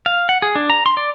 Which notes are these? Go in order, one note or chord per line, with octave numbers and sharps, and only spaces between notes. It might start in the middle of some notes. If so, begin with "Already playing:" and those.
F5
F#5
G#4
D4
A#5
C6
D5